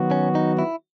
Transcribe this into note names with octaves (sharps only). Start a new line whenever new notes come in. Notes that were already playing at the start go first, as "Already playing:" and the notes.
Already playing: D#3 F#3 B3 F#4
C#4
D#4
E4